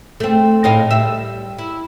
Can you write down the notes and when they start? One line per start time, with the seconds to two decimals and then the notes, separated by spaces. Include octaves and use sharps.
0.20 A3 C4
0.64 A2 D#5 F5
0.91 G3 E5
1.58 E4